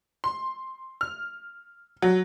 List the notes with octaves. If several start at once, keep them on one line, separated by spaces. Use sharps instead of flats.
C6
F6
F#3